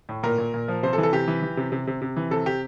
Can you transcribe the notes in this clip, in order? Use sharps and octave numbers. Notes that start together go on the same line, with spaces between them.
A2
A#2 A#4
A#2
A#2
F3
C3 C5
A4
E3
A4
C3 G4
E3
E3
C3
C3
C3
C3
E3
C3 A4
C3 G4